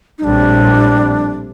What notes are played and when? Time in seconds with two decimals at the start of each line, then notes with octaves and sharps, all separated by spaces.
0.18 D#4
0.24 A#1 A2 G3 C4 D4